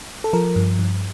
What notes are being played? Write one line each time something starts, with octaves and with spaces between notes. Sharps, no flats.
A4
F3 A#4
G2
G2